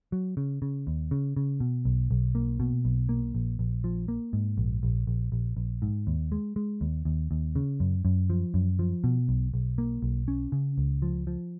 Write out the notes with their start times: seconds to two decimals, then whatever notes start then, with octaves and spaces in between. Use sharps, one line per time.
0.12 F#3
0.37 C#3
0.62 C#3
0.87 D#2
1.11 C#3
1.36 C#3
1.60 B2
1.85 B1
2.11 B1
2.35 A#3
2.60 B2
2.85 B1
3.09 A#3
3.35 A#1
3.59 A#1
3.84 F3
4.08 A#3
4.33 G#2
4.58 A#1
4.83 A#1
5.07 A#1
5.32 A#1
5.57 A#1
5.82 G#2
6.07 D#2
6.32 G#3
6.56 G#3
6.81 D#2
7.05 D#2
7.31 D#2
7.56 C#3
7.80 F#2
8.05 F#2
8.30 F3
8.54 F#2
8.79 F3
9.04 B2
9.29 B1
9.54 B1
9.78 A#3
10.02 B1
10.28 C#4
10.52 C#3
10.78 C#2
11.02 F3
11.27 F3